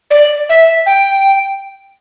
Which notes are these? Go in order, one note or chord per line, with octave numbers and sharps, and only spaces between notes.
D5
E5
G5